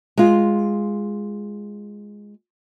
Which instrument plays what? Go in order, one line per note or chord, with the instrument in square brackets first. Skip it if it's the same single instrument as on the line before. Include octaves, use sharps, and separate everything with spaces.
[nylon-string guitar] G#3 F4